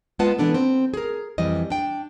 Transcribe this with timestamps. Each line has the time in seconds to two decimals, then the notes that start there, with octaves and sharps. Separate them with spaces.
0.19 G#3 B3 F4 B4 F#5 A5
0.38 E3 B3 D4 A4
0.54 C4
0.94 G#4 A#4
1.38 F2 E3 G3 D#5
1.70 D4 G5